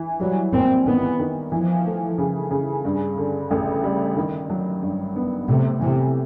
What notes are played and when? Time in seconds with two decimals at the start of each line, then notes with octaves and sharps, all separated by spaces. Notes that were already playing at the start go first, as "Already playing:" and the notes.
Already playing: E3
0.20 F#3 G3
0.53 A#3 C4
0.86 D#3 B3
1.19 D#3
1.52 E3 F3
1.86 A3
2.18 C#3
2.51 C#3
2.85 G2
3.18 D3
3.51 A1
3.84 G3
4.16 D#3
4.50 F#3
4.82 G2
5.16 B3
5.48 A2 C3
5.81 C3 E3